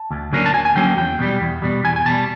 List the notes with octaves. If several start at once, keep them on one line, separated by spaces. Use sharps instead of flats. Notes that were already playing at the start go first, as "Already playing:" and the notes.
Already playing: A5
D2
D3 F#3 A#3 C#4
A5
D2 G#5
G#5
D3 F#3 A#3 C#4 G5
E2 G5
B2 G3
E2
B2 G3
E2 G#5
G#5
B2 G3 A5